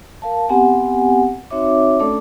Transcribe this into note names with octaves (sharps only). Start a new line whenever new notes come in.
A#4 F5 A5
B3 C4 G4 F#5 G#5
C4 D#4 F#4 C#5 E5 D6
A3 C#4 D4 A4 D5 D6